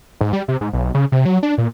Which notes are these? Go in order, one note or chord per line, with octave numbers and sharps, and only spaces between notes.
G#2
G3
C3
G#2
B1
C#3
C3
F#3
D4
A#2